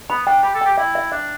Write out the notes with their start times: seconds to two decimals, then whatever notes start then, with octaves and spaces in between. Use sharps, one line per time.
0.10 B3 B5
0.26 D4 G5
0.43 G4 B5
0.55 A4
0.61 G4 G5
0.77 E4 E5
0.95 E5
1.12 D4 E5